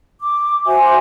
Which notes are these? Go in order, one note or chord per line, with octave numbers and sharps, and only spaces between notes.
D6
F#4 C5 E5 G#5